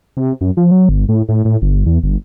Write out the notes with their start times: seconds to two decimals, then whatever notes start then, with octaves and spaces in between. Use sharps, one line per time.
0.17 C3
0.41 F#2
0.57 F3
0.71 F#3
0.89 G1
1.09 A2
1.29 A2
1.45 A2
1.62 G1
1.86 E2
2.03 G1